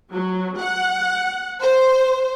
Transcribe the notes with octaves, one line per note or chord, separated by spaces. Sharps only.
F#3
F#5
C5